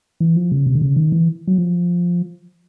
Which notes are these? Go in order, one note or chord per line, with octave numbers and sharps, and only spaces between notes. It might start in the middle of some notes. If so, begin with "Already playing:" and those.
E3
F3
C#3
C3
D3
C#3
D#3
E3
F#3
F3